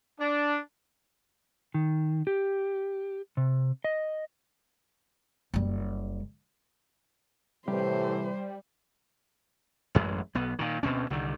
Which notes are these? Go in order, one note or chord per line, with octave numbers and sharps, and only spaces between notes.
D4
D#3
G4
C3
D#5
F#1 G3
A2 C3 E3 G3 C5
A1 F#2 G#3
B1 B3
A#2 D#3
D2 B2 C4 C#4
C2 D3 D#3